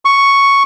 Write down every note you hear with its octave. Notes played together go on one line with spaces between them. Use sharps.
C#6